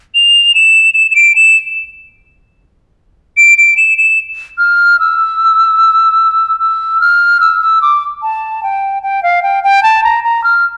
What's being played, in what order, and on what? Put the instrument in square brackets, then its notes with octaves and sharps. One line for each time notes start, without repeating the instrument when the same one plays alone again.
[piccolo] F7
E7
E7
E7
D7
E7
D7
D7
E7
E7
F6
E6
E6
F6
E6
E6
D6
A5
G5
G5
F5
G5
G5
A5
A#5
A#5
F6